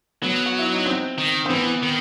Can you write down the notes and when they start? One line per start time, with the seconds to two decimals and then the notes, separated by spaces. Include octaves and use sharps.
0.22 F#3 B3
0.46 F#4
0.59 E4
0.73 D#4
0.86 C4
1.18 D#3
1.46 C4
1.50 E3 B3
1.83 D#3